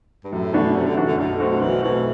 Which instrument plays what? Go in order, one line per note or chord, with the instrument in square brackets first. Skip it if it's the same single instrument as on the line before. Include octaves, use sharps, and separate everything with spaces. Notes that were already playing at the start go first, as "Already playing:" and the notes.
[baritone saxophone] G2
[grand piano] F#2 [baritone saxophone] A2
[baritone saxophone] B2 [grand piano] E3 A3 D4 F#4
[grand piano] F#2 [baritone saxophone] C3
[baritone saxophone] D3
[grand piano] E3 A3 D4 F#4
[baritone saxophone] D3
[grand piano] B1 [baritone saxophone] D3
[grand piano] B2 A3 C4 F#4
[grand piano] B1 [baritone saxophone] E3
[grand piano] B2 A3 C4 F#4 [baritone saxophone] E3